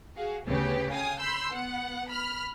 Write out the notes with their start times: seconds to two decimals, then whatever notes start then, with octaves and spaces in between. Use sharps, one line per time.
0.16 F#4 G#4 F5
0.47 D2 C#3 B3 G4 G#4 B4
0.91 F5 G5 G#5 D#6
1.20 B5 C6 E6 G6
1.52 B3 F#5
2.11 B5 F6